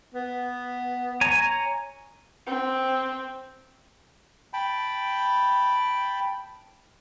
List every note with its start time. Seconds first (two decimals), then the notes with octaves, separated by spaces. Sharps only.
0.15 B3
1.21 C#5 G#5 A#5
2.47 C4
4.53 G5 A5 B5